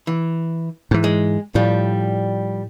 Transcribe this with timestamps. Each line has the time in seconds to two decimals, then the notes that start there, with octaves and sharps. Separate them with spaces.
0.07 E3
0.91 G#2 E3
1.04 G#3
1.55 A2 F3 G3